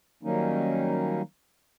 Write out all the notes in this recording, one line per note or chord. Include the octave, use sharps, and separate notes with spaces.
D#3 F#3 G3 A#3 C#4 D#4